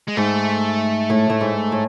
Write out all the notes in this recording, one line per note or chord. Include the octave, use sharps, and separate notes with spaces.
G#3
G#2 A3
A2
A2
G#2
A2